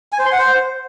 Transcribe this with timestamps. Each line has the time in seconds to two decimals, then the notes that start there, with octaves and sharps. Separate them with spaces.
0.12 G#5
0.19 C5
0.25 C6
0.32 F#5
0.38 C5